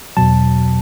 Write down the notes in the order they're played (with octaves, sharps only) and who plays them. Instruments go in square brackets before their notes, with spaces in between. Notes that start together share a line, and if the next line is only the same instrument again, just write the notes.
[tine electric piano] E2 B2 F#3 A5